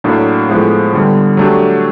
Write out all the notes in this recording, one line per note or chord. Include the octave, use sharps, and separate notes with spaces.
A2 F#3 A#3 D4
A2 F3 G#3 B3
D3 G3 B3
F#3 A3 D4 G4